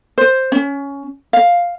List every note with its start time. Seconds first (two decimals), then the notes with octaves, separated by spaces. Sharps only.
0.18 C5
0.52 C#4
1.33 F5